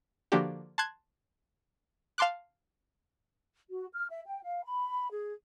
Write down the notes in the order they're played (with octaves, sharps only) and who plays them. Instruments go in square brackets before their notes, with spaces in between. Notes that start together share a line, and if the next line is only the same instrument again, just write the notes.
[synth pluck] D3 F3 A#3 D4 F#4 G4
A5 C6 F#6 G#6
F5 A5 C6 D6 F#6
[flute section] F#4
F6
E5
G5
F5
B5
G#4